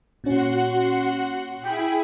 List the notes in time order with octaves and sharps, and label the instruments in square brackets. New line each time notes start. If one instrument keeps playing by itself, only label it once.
[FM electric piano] A#2 C#4 [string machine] F#4 F#5 C6
[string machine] E4 G#4 B5 [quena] G5